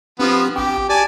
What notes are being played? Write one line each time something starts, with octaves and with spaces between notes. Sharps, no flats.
F3 B3 C4 D4 G4
A1 G4 G5
G4 D5 G#5 A5